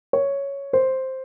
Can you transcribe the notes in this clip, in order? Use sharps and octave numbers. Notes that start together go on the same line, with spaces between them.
C#5
C5